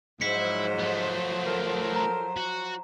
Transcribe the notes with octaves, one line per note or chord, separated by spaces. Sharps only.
G#2 F3 F#3 E4 C5 B6 C#7
A3 B3
A4 A#4
A#5
F#4